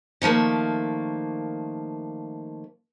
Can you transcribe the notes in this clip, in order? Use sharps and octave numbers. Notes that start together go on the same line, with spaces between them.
D#3 F3 A3 A#3